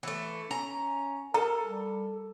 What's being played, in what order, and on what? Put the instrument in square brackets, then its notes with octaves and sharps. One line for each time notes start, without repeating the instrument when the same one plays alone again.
[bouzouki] E3 A3
[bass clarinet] C#4 [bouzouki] A#5
[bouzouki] A4 [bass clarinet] A#4 [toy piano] A#5
[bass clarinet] G3